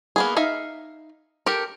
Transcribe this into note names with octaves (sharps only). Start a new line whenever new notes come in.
A#3 B3 G#4
D#4 E5 F5
G4 A4 A#4